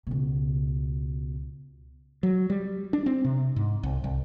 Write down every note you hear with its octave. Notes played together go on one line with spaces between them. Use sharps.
C#2 B2
F#3
G3
D4
C4
C3
G#2
C2
C2